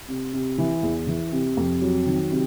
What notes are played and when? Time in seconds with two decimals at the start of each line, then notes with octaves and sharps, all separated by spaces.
0.08 C3
0.33 C3
0.58 E3
0.83 E2
1.07 E3
1.32 C3
1.57 F2
1.82 F#3
2.06 D#3
2.31 C3